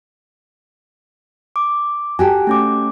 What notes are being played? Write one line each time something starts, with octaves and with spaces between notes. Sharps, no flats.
D6
F#4 G4 A4 G#5
A3 C#4 D6